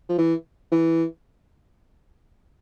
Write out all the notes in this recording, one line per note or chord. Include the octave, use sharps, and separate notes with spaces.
F3
E3
E3